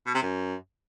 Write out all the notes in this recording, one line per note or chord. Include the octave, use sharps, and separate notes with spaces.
B2
C3
F#2